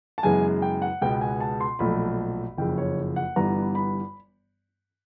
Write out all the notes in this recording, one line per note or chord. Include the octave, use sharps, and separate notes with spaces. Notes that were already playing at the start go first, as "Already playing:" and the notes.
A5
F#2 C#3 E3 G#3 B3 G#5
G5
F#5
C#2 B2 G#3 B3 G5
G#5
A5
C6
B1 A#2 F3 A3 B5
F#1 F2 C#3 G5
C#5
F#5
G1 G2 E3 G3 B3 A#5
B5